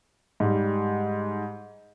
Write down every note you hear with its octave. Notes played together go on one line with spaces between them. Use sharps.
G#2 G3